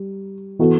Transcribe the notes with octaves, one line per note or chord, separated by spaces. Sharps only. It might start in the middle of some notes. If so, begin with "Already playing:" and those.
Already playing: G3
E3 B3 F#4 A4